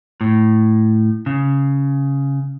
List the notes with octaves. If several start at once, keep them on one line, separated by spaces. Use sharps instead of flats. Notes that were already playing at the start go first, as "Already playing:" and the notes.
A2
C#3